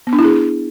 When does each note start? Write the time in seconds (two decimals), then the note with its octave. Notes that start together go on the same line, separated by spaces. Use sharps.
0.07 B3
0.13 D4
0.19 E4
0.24 G#4